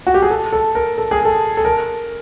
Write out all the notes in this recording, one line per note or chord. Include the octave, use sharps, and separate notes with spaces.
F#4
G4
G#4
A4
A4
A#4
A4
G#4
A4
A4
A#4